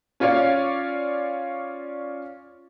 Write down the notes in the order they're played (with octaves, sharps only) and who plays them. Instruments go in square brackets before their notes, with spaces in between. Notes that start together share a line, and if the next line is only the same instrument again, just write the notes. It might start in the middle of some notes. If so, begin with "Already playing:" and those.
[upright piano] C#4 F4 C#5 D5 F5